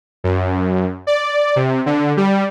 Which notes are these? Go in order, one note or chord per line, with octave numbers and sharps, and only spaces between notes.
F#2
D5
C3
D3
G3